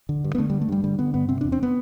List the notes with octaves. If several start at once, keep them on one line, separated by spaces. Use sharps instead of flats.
D3
G2
B3
D3 A3
G3
G2
A3
G2 G3
D3 G3
D3 B3
G2 B3
C3 C4
D4
E2
C4
B3